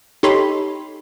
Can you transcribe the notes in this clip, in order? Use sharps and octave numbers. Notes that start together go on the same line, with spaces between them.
D#4 G4 A4 C#5 B5 C6